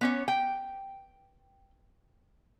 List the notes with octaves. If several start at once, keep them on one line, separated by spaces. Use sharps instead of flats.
B3 C#4 C#5
G5